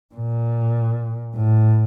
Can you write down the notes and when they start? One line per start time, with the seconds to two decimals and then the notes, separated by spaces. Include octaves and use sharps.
0.15 A#2
1.35 A2